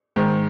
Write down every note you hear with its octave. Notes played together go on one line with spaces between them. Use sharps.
G#2 D#3 G#3